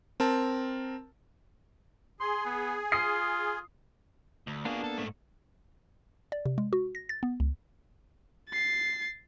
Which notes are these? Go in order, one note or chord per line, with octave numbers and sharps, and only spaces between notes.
C4 A#4 A5
G#4 C6
B3
F4 D#6 C7
D2
A#3 B3 D4 F4 G#4
A4
G#2 A3
D5
C3
G#3
F#4
A#6
A6
B3
C#2
A6 C7